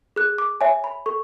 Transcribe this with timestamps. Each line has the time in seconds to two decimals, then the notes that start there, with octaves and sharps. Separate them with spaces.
0.16 G#4 F#6
0.38 D6
0.61 C#5 E5 G#5
0.84 B5
1.06 A4 C#6